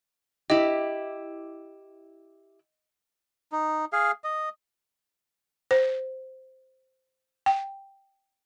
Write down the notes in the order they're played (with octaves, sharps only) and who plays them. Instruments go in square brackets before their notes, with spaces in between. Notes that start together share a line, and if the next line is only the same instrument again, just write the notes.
[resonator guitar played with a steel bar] E4 G4 [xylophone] D#5
[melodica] D#4
G#4 F5
D#5
[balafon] C5
G5